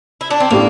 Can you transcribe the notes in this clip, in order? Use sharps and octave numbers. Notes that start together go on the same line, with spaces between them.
E4
D4
C4
A2 G3 A#3 D4